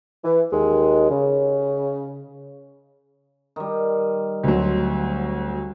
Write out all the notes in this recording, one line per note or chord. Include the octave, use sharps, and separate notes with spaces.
E3
D#2 G#3
C#3
D#3 G3
D2 F#3 C4